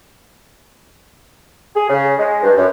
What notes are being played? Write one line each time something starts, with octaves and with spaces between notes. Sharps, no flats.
G#4
C#3
G#3
G2
F#2